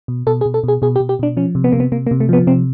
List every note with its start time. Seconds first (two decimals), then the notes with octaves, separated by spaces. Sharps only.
0.08 B2
0.27 B2 A4
0.41 G#4
0.46 B2
0.54 A4
0.64 B2 G#4
0.82 B2 G#4
0.96 G4
1.00 B2
1.09 G4
1.19 B2 D4
1.37 F3 C#4
1.55 C3
1.64 B3
1.72 C3 A#3
1.80 B3
1.92 C3 A#3
2.07 A#3
2.11 C3
2.20 A3
2.29 F3 B3
2.47 C3 C4